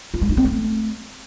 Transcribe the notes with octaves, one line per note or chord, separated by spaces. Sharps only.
F4
G#3
D4
C4
A3